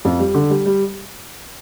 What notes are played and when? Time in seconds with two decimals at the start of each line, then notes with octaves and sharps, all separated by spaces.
0.05 F2
0.19 G3
0.35 D3
0.50 G3
0.66 G3